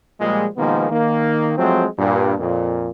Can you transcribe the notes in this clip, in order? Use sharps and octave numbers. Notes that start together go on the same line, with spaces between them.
A#2 F3 G3 G#3
B2 D#3 F3 G#3 A#3 B3
D#3 A#3
F3 F#3 G#3 A3 C4
G2 A#2
F2 A#2